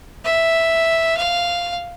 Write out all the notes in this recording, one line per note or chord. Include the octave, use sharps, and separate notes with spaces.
E5
F5